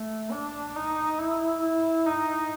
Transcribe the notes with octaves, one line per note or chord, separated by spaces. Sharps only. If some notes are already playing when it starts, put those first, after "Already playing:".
Already playing: A3
D4
D#4
E4
E4
D#4